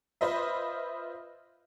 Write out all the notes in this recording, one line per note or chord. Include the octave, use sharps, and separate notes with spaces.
F4 B4 C5 D#5 E5